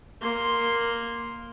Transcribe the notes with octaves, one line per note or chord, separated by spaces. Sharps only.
A#3 C6